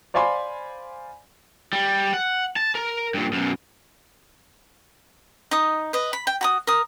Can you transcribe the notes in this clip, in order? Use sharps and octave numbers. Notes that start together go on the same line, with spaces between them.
C5 D5 F5 G#5 B5 C6
G3
F#5
A5
A#4
G2 A#2
F#2 B2
D#4 D#6
B4 D#5
B5
G5
F#4 A#5 D#6
A#4 D#6